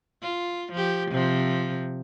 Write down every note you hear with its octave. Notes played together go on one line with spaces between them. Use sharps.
F4
F3 G4
C3 F3